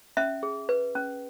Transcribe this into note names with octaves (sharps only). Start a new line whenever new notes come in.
C#4 E5
G#4
B4
C#4